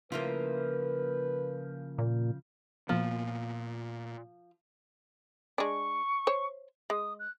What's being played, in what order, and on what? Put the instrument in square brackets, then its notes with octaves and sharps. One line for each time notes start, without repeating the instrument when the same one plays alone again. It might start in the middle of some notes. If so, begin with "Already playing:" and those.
[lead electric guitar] C#3 F3 [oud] A#3 E4 F4 [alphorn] B4
[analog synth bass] A#2
[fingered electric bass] A#2 A#3 B3 [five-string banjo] F3
[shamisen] G#3 D4 [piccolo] C#6
[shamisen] C5 C#5
[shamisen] G#3 [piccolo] D#6
[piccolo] F#6